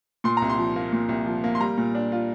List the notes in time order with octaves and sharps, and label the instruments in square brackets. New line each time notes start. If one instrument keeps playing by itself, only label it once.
[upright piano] A#2 C6
C2 A#5
C6
F3
A#3
A#2
C2
F3
A#3
C6
G3 A#5
A#2
D4
F4